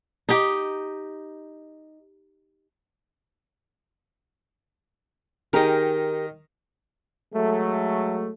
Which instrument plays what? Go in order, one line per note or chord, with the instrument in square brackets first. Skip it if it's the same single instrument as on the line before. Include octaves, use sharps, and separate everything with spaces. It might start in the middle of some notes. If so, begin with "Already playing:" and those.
[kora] D#4 G4
[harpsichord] D#3 D#4 [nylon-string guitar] G4 G#4 A#4
[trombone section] F#3 G#3 A3